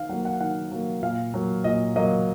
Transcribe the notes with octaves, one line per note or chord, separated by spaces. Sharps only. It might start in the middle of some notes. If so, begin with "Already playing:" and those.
Already playing: D#3 F5
F#3 A#3 F#5
F#5
D#3 F#5
F#3 A#3
A#2 F5
F#3 A#3
A#2 D#5
F#3 A#3 D#5